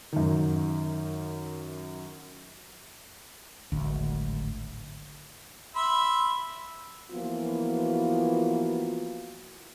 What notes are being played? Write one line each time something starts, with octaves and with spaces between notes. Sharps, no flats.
F#2 D#3
D1 G#1 D2
E5 B5 C6
E3 F3 A#3 B3 F4 F#4